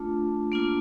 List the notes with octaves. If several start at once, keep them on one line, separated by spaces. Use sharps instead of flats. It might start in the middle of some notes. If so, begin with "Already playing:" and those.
Already playing: A3 D4 F4 A5
A#3 D4 F4